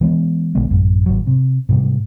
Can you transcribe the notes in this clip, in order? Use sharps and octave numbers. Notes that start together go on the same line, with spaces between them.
E3 G#3 B3
A#1 D3 G#3 B3
A1 F#2
G#1 F#3
C3
G#2 C3 G3